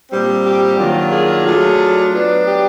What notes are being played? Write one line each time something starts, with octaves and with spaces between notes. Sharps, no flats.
A#2 G3 C4
G4
D#3 F#3 A#3 D4 F4
G#4
F#3 A3 D4 F4
F#3 B3 D4
G4